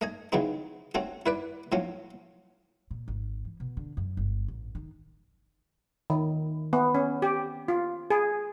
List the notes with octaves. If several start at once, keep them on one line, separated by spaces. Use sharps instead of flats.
A3 D#5 G#5
C#3 E3 F#3 G#3 C4 D#4
A3 C4 C#4 F#4
E4 B4 D5
A2 F3 F#3 C#4
A#2
G#1
E3
B2
D3
F#2
G1
A1
D#3
D#3
B3
C#4
G4
F4
G#4